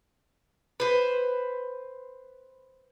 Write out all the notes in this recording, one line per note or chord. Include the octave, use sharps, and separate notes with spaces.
B4 C5